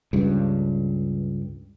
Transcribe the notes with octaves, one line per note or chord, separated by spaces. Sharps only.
C#2 G2